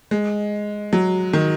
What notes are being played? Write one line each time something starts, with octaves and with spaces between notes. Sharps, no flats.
G#3
F#3
D#3